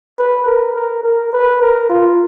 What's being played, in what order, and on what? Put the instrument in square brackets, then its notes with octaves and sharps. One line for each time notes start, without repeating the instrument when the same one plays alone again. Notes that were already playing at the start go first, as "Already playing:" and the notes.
[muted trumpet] B4
A#4
A#4
A#4
B4
A#4
F4